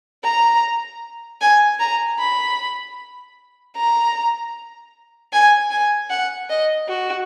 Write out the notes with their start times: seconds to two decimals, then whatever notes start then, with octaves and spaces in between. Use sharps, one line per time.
0.23 A#5
1.41 G#5
1.80 A#5
2.19 B5
3.76 A#5
5.32 G#5
5.71 G#5
6.10 F#5
6.50 D#5
6.88 F#4